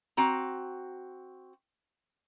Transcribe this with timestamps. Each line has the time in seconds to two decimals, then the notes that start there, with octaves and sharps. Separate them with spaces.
0.17 C4 F#4 A#5